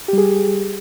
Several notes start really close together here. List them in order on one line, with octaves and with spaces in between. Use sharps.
G4 G3 G#4